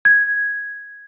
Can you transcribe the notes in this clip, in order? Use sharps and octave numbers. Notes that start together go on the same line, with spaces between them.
G#6